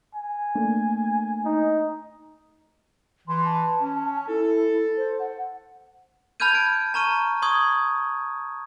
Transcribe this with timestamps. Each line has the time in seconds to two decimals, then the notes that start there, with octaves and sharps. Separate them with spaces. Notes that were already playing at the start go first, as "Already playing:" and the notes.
0.15 G#5
0.55 A3 A#3 D4
1.45 D#4
3.28 E3 C6
3.45 A5
3.81 C#4
4.28 E4 A4
4.97 C5
5.19 F#5
6.40 A5 B5 F6 G6 G#6 D#7
6.55 D7
6.94 A5 A#5 C#6 F6 D#7
7.42 C6 C#6 D#6 G#6